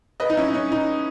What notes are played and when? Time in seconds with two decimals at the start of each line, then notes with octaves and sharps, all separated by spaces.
0.20 B4 D#5
0.30 D#4
0.37 C#4 E4
0.48 D#4
0.54 C#4
0.72 D#4